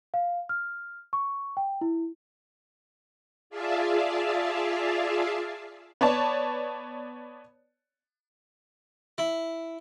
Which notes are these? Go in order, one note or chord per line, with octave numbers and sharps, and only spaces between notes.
F5
F6
C#6
G5
E4
F4 G#4 D5 E5 F5 A5
B3 C#5 D5 A5
E4